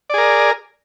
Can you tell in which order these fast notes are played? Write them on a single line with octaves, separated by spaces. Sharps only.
D5 G#4 A#4